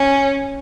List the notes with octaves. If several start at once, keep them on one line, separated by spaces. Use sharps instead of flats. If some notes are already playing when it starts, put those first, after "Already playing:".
Already playing: C#4